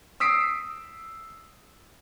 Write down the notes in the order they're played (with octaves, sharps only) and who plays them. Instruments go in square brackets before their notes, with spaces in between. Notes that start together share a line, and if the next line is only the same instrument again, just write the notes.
[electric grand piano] D#6 E6 B6 C7 D7